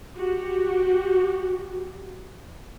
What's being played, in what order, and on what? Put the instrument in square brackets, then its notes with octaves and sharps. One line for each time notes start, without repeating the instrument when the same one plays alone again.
[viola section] F#4 G4